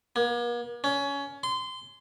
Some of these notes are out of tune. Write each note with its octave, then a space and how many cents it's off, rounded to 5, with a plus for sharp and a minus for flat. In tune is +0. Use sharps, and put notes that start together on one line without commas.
A#3 +45
C#4 +20
C6 -20